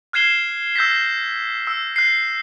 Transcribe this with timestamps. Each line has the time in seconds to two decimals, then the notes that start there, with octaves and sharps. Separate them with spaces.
0.13 F6 F#6 G#6 C7 E7 G7
0.76 E6 G6 A#6 B6
1.67 E6
1.96 F#6 C7